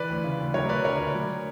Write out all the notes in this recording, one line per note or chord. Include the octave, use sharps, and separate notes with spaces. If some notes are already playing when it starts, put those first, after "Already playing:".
Already playing: E3 B4 D5
D2
C#3
D2
F#3 A#4 C#5
D2 B4 D5
D3 A#4 C#5
D2
F#3